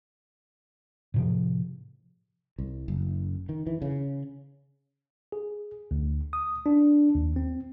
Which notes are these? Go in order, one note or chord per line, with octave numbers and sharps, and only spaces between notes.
A2 C3 F3
C2
F#1
D#3
E3
C#3
G#4
D2
D#6
D4
D#2
C4